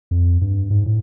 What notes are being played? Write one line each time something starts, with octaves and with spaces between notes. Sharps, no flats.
F2
G2
G#2
A2